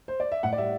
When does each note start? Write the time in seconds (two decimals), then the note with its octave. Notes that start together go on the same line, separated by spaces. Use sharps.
0.08 C5
0.20 D5
0.32 E5
0.43 A2 F#5
0.53 D5
0.58 G3 E5